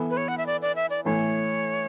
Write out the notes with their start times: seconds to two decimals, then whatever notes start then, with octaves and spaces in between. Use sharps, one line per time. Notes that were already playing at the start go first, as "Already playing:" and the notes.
Already playing: E3 B3 E4 A4
0.10 B4
0.17 C#5
0.28 F#5
0.38 E5
0.46 D5
0.62 D5
0.76 E5
0.90 D5
1.05 A2 E3 A3 C#5